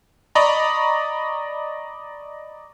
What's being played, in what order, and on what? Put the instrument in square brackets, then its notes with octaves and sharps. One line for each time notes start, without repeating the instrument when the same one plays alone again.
[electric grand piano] D5 D#5 A#5 B5 C#6